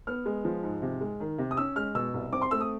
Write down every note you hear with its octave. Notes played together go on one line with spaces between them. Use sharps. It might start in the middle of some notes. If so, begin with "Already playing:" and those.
B3 F6
G#3
F3
G#2
C3
G#3
D#3
C3
D#6
C#4 E6
G#3 F6
B2 E6
C2
C4 D6
C6
A3 E6
D#6